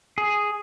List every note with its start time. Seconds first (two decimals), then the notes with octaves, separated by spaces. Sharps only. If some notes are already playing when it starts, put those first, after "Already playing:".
0.18 G#4